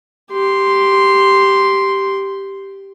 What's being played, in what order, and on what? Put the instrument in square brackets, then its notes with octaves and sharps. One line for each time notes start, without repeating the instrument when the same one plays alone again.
[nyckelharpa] G4 C6